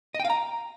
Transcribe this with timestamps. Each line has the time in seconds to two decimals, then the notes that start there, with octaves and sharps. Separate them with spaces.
0.15 D#5
0.20 G5
0.25 F5
0.30 A#5